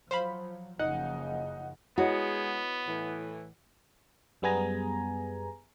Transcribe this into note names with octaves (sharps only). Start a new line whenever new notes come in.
F3 F#3 C5 F5 B5
F#1 C#3 F3 D#4 F#5
G#3 B3 E4 F#4 G#4 C#5 D#5
A2 E3
F#2 G3 B3 G#4 G#5 A#5